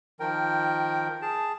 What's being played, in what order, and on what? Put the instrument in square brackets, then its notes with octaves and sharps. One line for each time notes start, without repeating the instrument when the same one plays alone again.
[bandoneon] D#3 F3 A#4 G5
G#4 A5